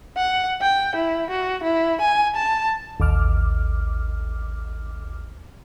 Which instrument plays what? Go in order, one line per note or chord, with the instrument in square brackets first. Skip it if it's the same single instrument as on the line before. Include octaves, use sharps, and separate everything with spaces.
[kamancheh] F#5
G5
E4
F#4
E4
G#5
A5
[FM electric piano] A1 D#2 D6 F6